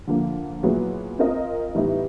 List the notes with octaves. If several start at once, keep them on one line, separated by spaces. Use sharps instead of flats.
D3 F3 A#3
A#2 F#3 B3 E4 G#4
C4 F4 A#4 D#5
A2 E3 G3 B3 D#4